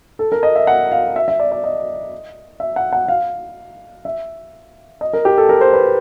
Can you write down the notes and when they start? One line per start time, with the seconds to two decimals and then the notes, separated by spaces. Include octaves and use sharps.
0.19 A4
0.32 A#4
0.43 D#5
0.56 E5
0.67 F#5
0.92 F5
1.16 E5
1.28 E5
1.40 D5
1.52 D5
1.64 D#5
2.60 E5
2.76 F#5
2.93 F#5
3.08 F5
4.05 E5
5.01 D#5
5.13 A#4
5.25 G4
5.38 A4
5.49 A#4
5.61 C5
5.73 B4